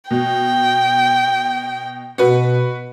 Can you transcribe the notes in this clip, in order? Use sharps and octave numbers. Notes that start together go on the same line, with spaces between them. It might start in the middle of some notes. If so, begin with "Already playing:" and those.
B2 G5
B2 F#4 B4